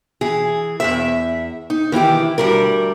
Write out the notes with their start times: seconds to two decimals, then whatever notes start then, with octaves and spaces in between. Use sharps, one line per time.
0.21 E3 G#4
0.80 E2 C3 E5
1.70 D#4
1.92 D#3 E3 E4 G4
2.38 D2 G3 A#4